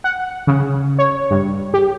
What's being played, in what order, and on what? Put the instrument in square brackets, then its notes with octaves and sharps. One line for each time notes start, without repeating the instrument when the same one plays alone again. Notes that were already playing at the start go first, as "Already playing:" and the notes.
[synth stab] F#5
C#3
C#5
G2
G4